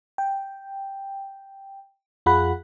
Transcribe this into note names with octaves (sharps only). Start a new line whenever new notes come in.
G5
F2 F4 G#4 F#5 B5 F#6